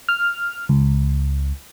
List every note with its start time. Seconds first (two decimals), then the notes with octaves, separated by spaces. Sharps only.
0.09 F6
0.69 C#2